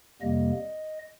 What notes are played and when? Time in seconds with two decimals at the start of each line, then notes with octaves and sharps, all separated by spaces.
0.21 F2 C3 G3 A#3 D#5